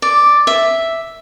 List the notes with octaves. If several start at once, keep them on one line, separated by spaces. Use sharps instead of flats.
D5
E5